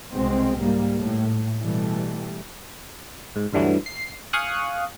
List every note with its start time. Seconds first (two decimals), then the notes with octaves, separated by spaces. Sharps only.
0.13 C2 B2 G#3 C4
0.60 G#2 G3 A#3
0.98 A2
1.58 B2 E3 G3 A3
3.36 G#2
3.53 D2 G2 D3 E3 F#3
3.86 C7
4.33 F5 G#5 C#6 D#6 F6 F#6